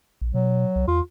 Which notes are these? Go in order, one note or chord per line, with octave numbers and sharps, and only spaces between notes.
A#1
B2 F#3
C2
E2 F4